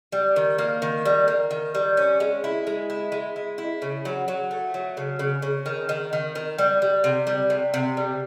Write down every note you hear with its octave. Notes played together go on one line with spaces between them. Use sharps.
G3
D#3
A#3
D#3
G3
A#3
D#3
G3
C#4
G#3
E4
G#3
E4
G#3
E4
E4
C#3
F#3
F#3
A3
F#3
C#3
C#3
C#3
D#3
D#3
D#3
D#3
G3
G3
C3
G3
C3
C3
G3